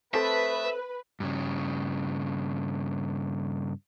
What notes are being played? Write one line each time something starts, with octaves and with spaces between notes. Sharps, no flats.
A3 C4 A4 B4 E5 A5 D#6
G2 C#3